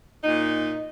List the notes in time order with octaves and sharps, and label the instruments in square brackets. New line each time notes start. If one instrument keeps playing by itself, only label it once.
[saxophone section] A#2 D#4